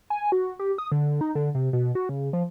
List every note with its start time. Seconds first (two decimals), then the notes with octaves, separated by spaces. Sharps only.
0.10 G#5
0.32 F#4
0.59 G4
0.78 D#6
0.92 D3
1.21 D#4
1.35 D3
1.55 C3
1.73 B2
1.95 F#4
2.09 C#3
2.33 F3